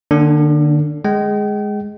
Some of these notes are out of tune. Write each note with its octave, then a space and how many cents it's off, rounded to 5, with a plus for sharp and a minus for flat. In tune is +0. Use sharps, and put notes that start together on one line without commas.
D3 +35 A#3 +0 D4 -25
G#3 +0 G5 -40